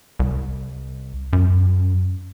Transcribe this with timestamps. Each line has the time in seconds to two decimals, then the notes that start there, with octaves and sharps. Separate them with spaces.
0.20 C2
1.33 F#2